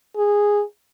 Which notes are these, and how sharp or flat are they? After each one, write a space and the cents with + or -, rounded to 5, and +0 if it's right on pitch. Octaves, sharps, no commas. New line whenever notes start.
G#4 -10